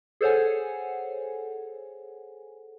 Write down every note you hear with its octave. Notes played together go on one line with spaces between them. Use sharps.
G#4 A4 C5 C#5 F#5 G#5